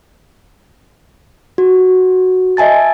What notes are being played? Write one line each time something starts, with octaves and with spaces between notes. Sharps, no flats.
F#4
D#5 E5 G#5 A5 A6